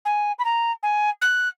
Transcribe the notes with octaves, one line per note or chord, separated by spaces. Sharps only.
G#5
B5
A#5
G#5
F#6